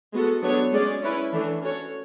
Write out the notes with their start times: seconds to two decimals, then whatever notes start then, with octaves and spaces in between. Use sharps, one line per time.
0.12 G#3 B3 F#4 A4
0.42 F#3 B3 D4 A4 C#5
0.72 G#3 C#4 G#4 D5
1.02 C#4 E4 B4
1.32 E3 A3 D4
1.62 C#4 F#4 A4 C#5